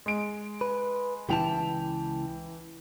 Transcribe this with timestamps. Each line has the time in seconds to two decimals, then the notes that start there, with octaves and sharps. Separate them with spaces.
0.06 G#3 D7
0.61 B4
1.29 C#2 E3 E4 G5 A5 F7